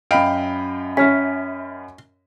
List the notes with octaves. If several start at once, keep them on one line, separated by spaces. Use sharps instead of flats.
F#2 D#5 F5 G5 B5 D7
C#4 E5 F6 B6